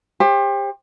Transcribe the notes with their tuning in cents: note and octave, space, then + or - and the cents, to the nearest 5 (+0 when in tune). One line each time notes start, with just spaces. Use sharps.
G4 +30 C5 +40